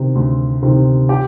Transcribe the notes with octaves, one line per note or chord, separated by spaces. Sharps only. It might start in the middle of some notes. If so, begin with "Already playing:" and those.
Already playing: C3 D#3
D2
C3 D#3
G4